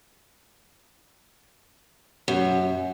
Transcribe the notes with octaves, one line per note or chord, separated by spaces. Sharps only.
F#2